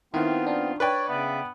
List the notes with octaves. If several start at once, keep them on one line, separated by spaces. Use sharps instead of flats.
D#3 B3 C4 E4 F4 F#5
D4 F4
B4 C#5 D5 G5
C#3 B3 E5